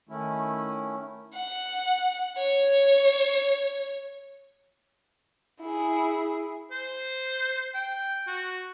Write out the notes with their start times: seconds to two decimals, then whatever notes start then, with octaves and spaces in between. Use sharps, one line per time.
0.09 D#3 A3 C#4 E4
1.35 F#5
2.38 C#5
5.61 E4 G#4
6.71 C5
7.74 G5
8.27 F#4